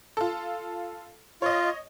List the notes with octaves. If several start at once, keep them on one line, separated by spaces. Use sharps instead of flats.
F4 A4
F4 C#5 D#5